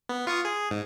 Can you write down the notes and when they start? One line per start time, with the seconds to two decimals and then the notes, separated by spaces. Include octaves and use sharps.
0.09 B3
0.27 F4 C#6 D#6
0.45 G#4
0.71 G#2